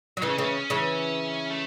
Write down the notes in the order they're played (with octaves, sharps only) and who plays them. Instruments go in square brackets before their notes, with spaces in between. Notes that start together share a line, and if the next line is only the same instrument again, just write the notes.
[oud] F#3
[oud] C#3 E3 [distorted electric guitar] D#4
[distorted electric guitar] C#4
[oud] C#3 E3 [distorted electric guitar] C4
[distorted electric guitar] C#4
[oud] C#3 E3
[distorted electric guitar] A3